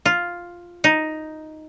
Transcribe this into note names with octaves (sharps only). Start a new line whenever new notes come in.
F4
D#4